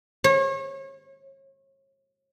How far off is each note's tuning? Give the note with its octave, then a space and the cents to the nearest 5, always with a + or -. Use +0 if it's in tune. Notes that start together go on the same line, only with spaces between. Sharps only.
C#5 -35